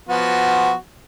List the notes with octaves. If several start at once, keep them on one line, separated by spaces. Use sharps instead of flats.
F3 B3 F#4